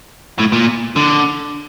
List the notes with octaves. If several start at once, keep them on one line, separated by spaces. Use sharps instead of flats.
A2
A#2
D3